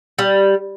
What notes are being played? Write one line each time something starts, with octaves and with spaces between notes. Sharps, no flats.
G3